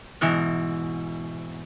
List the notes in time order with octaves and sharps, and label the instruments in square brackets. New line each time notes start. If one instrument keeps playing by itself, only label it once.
[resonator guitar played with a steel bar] G#2 B2 E3